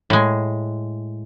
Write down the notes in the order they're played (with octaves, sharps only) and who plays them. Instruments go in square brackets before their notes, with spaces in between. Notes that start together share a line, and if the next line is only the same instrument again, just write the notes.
[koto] A2 G#3